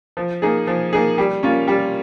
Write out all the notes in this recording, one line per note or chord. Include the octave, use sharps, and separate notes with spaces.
F3
A#3 D#4 G#4
F3
A#3 D#4 G#4
G3
A#3 C#4 F4
G3